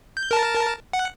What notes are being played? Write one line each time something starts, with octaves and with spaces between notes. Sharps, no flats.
G6
A#4 A5
F#5